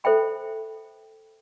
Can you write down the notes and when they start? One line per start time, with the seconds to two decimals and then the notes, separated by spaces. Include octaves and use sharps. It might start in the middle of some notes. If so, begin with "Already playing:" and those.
0.04 A4 C5 E5 G5 B5